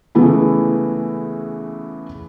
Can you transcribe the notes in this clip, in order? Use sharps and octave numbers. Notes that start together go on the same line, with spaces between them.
C#3 E3 G#3 A3 B3 E4